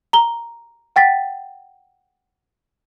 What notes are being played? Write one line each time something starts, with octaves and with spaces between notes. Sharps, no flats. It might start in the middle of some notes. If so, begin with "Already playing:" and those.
A#5 G7
F#5 G5 A6 B6